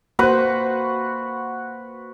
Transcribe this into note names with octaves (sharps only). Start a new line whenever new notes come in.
A#3 F#4 B4 C5 F#5